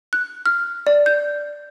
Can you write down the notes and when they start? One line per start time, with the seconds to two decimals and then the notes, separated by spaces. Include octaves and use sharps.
0.13 F#6
0.46 F6
0.87 D5
1.06 G6